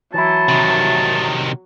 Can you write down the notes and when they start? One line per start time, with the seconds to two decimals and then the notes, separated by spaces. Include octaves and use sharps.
0.14 E3 F#3 E4 A5
0.49 C3 D#3